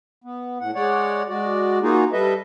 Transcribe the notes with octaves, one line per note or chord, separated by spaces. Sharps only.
B3
A2 F#5
G#3 C#5 D5 F#5
G#3 F#4 D5
A#3 D#4 F4 F#4 G#4
G3 A4 B4 D#5 E5